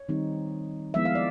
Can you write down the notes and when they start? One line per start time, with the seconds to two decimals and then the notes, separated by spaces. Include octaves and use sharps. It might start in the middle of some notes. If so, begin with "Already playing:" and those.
Already playing: C#5
0.09 D#3 G3 C4 D#4
0.94 F3 G#3 B3 E4 E5
1.05 F5
1.15 D5